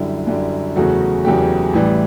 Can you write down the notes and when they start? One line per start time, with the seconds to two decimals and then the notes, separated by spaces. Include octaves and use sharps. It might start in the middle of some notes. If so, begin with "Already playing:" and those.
Already playing: F#2 D3 G3 E4
0.27 F#2 D3 G3
0.76 E2 C#3 F#3 A3 F#4
1.24 E2 C#3 F#3 A3 G4
1.73 A1 A2 E3 G3